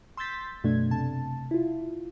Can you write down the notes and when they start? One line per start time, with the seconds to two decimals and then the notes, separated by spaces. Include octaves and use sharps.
0.17 C6 E6 G6 A6 B6
0.64 F#2 B2 A3 D4 G#6
0.91 C3 A5
1.51 E4 F4